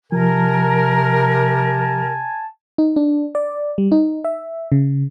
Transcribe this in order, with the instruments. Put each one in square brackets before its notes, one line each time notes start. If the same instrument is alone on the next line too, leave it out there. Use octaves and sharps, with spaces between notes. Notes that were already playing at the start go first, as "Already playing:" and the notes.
[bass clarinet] C3 [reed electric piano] F3 [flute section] A#4 [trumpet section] G#5 A5
[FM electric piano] D#4
D4
D5
G3
D#4
E5
C#3